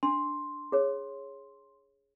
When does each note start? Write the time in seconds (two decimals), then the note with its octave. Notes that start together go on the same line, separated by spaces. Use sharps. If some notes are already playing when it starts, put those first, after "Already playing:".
0.03 D4 C6
0.72 G#4 C#5